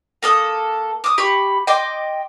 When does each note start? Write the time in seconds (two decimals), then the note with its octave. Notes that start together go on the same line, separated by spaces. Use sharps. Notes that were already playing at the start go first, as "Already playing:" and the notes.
0.23 A#3 A4 D#6
1.04 D6 D#6
1.18 G4 B5 C#6
1.67 D#5 G5 C6 D6